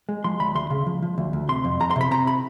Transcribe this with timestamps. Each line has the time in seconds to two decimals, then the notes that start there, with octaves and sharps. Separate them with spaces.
0.09 G#3
0.24 F3 C6
0.40 D2 B5
0.55 D2 C6
0.70 C#3
0.86 F3
1.02 F3
1.18 D2
1.33 D2
1.49 C3 C6
1.65 F2
1.80 F2 A#5
1.91 C6
1.96 C3 B5
2.11 C3 A#5
2.27 B5